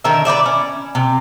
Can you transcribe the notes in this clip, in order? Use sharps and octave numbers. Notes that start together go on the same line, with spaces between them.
D3 D#3 A#4 E5
B4 C5 D5 E5
C#4
C3